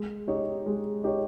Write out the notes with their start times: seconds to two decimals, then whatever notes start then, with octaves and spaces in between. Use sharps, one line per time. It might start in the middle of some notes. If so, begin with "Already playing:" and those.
Already playing: G#3
0.28 D#4 G4 C#5
0.66 G#3
1.04 D#4 G4 C#5